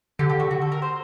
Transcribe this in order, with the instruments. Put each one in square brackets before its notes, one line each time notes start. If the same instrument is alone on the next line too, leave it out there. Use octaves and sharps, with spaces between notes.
[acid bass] D3 [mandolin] G4
[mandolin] G4
F#4
F#4
A4
A#4
C5